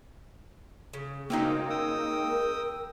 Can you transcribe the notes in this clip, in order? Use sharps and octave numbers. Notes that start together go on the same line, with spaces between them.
C#3
C#3 G#3 A#3 C4 D#4 F#4
A#4 G5 D#6 E6